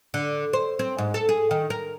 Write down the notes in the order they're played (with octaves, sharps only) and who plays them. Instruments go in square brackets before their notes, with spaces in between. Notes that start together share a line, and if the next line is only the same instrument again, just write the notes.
[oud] D3
C5
C4
G#2
A4
G#4
D#3
A#4